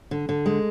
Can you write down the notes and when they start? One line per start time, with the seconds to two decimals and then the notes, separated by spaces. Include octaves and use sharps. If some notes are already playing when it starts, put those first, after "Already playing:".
0.11 D3
0.29 D3
0.46 G#3